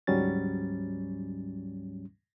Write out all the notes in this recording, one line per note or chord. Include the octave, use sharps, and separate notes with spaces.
D2 G#2 F#3 G3 C#4 A6